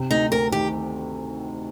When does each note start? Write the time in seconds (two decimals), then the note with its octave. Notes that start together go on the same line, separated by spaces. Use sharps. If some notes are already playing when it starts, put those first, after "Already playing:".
Already playing: C3
0.10 D2 D#4
0.32 D2 A#4
0.52 D#3 G4